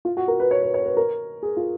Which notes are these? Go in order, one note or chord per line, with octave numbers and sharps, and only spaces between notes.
F4
F#4
A#4
B4
C#5
B4
C#5
B4
A#4
G#4
F4